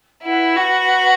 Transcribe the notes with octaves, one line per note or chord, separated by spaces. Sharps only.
E4 B4 F#5 B5
F#4